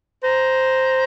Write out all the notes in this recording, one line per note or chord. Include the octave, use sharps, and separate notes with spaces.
C5 A#5